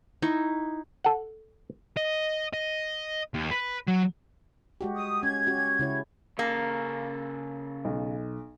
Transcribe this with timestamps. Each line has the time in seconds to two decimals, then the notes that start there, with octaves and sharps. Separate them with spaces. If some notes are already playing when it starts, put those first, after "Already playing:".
0.22 D#4 E4 C#6
1.04 A4 F#5
1.97 D#5
2.53 D#5
3.34 D#2
3.51 B4
3.88 F#3
4.81 G#3 F#4 G4
4.95 D#6
5.23 C#4 G#6
5.47 C#4 F#4 G4
5.79 C#3 E4 C#5
6.39 C#3 A#3 A4
7.85 B1